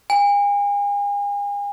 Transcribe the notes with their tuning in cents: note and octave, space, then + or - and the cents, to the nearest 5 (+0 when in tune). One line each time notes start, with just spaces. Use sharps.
G#5 -40